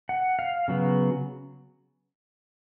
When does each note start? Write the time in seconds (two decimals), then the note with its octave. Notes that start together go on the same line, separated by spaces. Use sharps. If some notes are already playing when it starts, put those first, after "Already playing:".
0.09 F#5
0.39 F5
0.68 C#3 F#3 B3